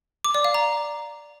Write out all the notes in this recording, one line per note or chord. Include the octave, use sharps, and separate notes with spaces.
D6
D5
F5
A#5